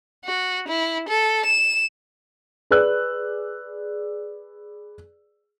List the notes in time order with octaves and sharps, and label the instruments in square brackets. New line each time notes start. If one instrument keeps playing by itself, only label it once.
[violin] F#4
E4
A4
E7
[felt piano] G#4 B4 D5 E6 F#6